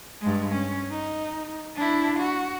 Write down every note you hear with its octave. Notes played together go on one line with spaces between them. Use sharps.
G2 G#3
C#4
D#4
D4 E4
F#4